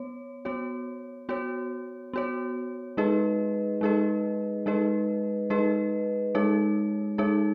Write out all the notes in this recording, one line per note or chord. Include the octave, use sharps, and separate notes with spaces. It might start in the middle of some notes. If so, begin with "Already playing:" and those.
Already playing: B3 C#5
B3 F#4 C#5
B3 F#4 C#5
B3 F#4 C#5
G#3 D#4 G#4 B4 D#5
G#3 D#4 G#4 B4 D#5
G#3 D#4 G#4 B4 D#5
G#3 D#4 G#4 B4 D#5
G#3 D#4 G#4 C#5
G#3 D#4 G#4 C#5